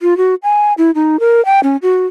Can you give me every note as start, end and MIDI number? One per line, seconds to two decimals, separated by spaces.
0.01 0.17 65
0.17 0.35 66
0.43 0.73 80
0.78 0.91 64
0.95 1.20 63
1.20 1.44 70
1.45 1.60 79
1.63 1.76 61
1.82 2.06 66